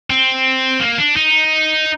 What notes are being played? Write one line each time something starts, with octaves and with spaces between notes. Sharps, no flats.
C4
A#3
D4
D#4